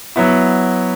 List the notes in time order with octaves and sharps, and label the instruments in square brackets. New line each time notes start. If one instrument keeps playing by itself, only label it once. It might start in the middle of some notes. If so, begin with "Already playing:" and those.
[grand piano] F#3 B3 E4